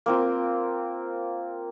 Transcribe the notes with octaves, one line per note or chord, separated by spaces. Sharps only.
A#3 C4 F4